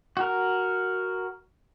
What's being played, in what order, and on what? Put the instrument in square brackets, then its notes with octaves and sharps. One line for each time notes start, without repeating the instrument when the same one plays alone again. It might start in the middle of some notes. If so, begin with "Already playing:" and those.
[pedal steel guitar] F#4 A#4